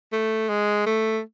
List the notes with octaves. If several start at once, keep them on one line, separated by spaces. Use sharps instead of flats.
A3
G#3
A3